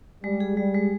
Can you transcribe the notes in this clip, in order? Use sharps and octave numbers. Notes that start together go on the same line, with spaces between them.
G3 G#3
G#4
G3 G#3
G#3